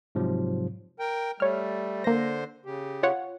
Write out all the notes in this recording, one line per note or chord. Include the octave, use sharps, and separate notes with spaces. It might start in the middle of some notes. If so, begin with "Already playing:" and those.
G#2 C3 F3 F#3
A#4 G5
G3 A3 C#5 F6
D3 A#3 C5 A#6
C#3 G4
F4 C#5 F#5